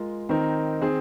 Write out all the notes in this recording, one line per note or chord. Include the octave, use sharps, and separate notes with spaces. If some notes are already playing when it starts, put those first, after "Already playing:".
Already playing: G#3 F4 A#4
D#3 C4 D#4 A#4
D#3 C4 G#4